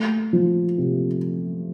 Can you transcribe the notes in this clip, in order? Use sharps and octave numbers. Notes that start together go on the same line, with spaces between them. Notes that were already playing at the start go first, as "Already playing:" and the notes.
Already playing: A3
F3
C3